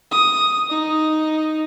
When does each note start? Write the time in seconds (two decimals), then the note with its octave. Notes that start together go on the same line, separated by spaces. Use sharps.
0.12 D#6
0.70 D#4